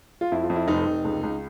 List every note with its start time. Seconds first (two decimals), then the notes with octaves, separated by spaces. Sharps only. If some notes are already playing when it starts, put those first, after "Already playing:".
0.21 F4
0.32 F2 E4
0.43 F4
0.50 F2
0.56 E4
0.68 F1 D#4
0.86 F1
1.05 C#2
1.23 C#2